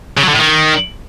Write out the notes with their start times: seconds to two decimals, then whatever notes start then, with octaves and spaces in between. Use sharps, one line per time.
0.17 C#3
0.23 F#3
0.28 D3
0.34 A2
0.39 D#3